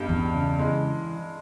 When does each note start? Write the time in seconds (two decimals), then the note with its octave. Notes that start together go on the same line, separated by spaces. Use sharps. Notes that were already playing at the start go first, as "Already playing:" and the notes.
Already playing: C#2 G2 G3
0.09 E2
0.34 C#3
0.59 E3 G#3